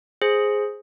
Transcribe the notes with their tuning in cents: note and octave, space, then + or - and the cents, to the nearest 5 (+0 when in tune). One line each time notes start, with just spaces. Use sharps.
G#4 +0 C5 +5